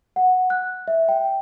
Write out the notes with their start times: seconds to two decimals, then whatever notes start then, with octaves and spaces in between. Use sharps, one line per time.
0.16 F#5
0.50 F#6
0.88 E5
1.09 G5